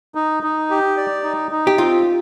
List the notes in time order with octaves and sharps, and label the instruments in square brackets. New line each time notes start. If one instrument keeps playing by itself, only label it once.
[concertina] D#4
D#4
G4
D5
D#4
D#4
[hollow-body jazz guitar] G4
[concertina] C4 [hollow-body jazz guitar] F4